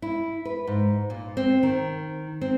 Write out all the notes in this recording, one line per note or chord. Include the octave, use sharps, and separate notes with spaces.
E4
B4
G#2
A#2
C4
D#3
C4